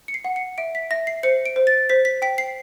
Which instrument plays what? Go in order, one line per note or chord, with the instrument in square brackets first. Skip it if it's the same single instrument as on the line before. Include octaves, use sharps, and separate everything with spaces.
[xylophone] C#7
C7
F#5
C#7
E5 D7
B6
E5 A#6
C7
C5 C#7
D7
C5
A6
C5 B6
B6
G5 B6
C7